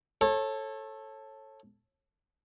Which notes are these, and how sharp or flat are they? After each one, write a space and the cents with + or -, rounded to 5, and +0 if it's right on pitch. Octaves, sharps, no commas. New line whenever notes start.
A4 +0 C#5 -30